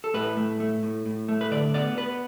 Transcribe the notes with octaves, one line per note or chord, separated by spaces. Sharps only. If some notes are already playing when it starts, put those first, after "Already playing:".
A4
A2 B4
A3
A3
A2
A2
A3
B4
D3 D5
B3 D5
B3 B4